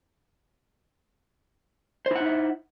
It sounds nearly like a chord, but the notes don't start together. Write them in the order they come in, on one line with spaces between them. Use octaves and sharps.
C5 E4 F#5 D#4 E5